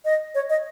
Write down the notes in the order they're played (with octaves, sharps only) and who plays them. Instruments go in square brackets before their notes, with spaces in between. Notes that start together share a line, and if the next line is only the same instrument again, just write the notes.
[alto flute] D#5
C#5
D#5